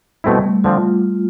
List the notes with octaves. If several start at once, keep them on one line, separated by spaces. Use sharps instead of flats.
B2 G3 A3 C4 E4
A3
D3 F3 C4 F4